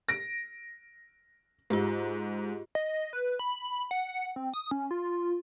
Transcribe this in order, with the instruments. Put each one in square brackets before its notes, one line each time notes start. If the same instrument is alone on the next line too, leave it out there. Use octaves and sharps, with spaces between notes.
[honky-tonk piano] A#6 D7
[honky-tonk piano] G#2 [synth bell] F4 G4
[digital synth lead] D#5
B4
B5
F#5
C4
D#6
C#4
F4